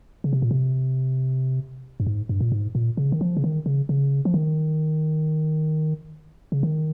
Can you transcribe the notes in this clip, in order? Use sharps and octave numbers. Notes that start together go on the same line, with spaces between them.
C#3
C3
A#2
C3
G2
G#2
G2
A#2
G#2
A#2
C#3
D#3
F3
C#3
D#3
C#3
C#3
F3
D#3
C#3
D#3